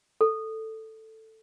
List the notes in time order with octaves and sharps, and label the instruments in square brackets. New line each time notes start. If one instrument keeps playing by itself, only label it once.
[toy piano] A4